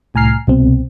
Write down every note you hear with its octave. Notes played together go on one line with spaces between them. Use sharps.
C2 A2 G#5 A#5 F6 C7
C2 B2 C4